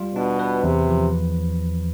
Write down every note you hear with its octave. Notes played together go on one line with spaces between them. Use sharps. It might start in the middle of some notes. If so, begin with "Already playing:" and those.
Already playing: G3 F4
B2 D4
B4
E2 C3
F3